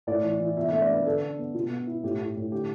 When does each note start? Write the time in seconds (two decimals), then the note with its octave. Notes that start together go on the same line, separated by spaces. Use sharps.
0.07 A2 D5
0.23 E3
0.40 E3
0.57 B2 E5
0.69 A3 E5
0.82 D5
0.90 D4 B4
1.06 D3 A4
1.22 D4
1.39 B3
1.55 B2
1.71 B3
1.87 E4
2.03 A2 G4
2.20 A2
2.37 A2
2.52 D3 G4